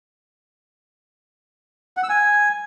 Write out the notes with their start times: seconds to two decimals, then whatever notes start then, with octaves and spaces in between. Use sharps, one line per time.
1.97 F#5
2.03 E6
2.09 G#5